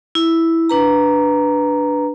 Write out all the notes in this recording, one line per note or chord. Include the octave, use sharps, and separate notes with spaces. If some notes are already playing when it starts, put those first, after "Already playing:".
E4
D4 B4 A#5